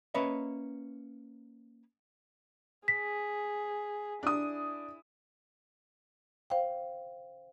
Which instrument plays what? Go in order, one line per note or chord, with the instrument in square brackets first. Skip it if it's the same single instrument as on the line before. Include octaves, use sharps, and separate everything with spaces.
[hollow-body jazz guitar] A#3 C#4 B4 C#5 D#5 E5
[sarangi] G#4 [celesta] B6
[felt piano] D4 D#6 [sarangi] E4
[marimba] C5 F5 G5